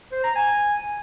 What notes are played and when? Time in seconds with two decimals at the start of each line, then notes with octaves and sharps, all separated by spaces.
0.12 C5
0.24 A#5
0.35 G#5